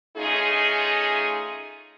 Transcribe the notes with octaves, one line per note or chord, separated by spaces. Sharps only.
A3 C#4 D#4 F4 G#4